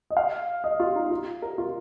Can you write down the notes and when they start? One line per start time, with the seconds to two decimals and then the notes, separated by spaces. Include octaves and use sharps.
0.10 D#5
0.17 F5
0.64 D#5
0.80 F4
0.96 D#4
1.11 F4
1.42 A#4
1.58 F4